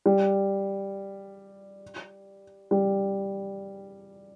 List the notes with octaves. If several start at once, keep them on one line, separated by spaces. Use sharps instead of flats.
G3
G3